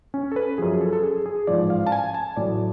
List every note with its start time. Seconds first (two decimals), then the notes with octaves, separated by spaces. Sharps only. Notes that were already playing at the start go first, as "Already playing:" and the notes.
0.14 C#4
0.32 A4
0.36 B4
0.58 F#2 F3 G#4
0.81 A4
0.93 A4
1.03 G#4
1.26 G#4
1.47 A1 G#2 F3 D5
1.70 F5
1.87 A5
1.92 G#5
2.14 A5
2.36 A1 A2 F#3 D5